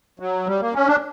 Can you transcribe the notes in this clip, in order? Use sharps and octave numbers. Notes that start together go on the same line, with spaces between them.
F#3
G3
A#3
C#4
D4